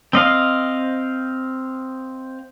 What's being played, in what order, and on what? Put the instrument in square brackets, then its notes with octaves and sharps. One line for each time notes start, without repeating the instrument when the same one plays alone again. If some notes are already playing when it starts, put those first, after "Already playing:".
[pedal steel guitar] C4 D#5 F5